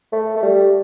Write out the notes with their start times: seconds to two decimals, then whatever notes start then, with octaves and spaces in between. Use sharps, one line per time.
0.12 A3
0.37 A3
0.43 G3